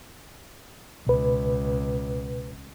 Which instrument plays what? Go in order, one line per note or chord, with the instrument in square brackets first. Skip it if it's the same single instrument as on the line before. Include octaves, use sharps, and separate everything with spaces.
[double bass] C#2 [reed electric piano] B2 B4